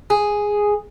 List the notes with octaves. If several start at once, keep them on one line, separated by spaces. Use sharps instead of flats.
G#4